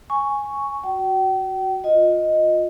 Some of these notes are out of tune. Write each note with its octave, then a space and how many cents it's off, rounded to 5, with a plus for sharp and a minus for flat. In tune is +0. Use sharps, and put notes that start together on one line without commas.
G#5 -5 C#6 +0
F#4 +0 G5 -40
F4 +25 D#5 +0